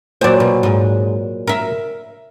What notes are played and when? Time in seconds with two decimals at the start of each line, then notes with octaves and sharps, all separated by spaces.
0.21 A#2 F#3 C5 D5
0.40 B2
0.63 G#2
1.47 A#4 E5